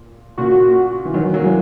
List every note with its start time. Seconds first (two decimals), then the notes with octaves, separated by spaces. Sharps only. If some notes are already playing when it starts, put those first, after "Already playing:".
Already playing: A#2
0.37 A#2 C#3 F#4
1.05 E3
1.14 D#3 F#3
1.33 F#3 A#3
1.43 E3 G#3